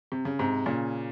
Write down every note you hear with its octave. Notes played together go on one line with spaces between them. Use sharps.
C3
C#3
G#2 C3
A#2 C#3